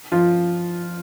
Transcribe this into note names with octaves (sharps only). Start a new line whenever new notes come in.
F3 F4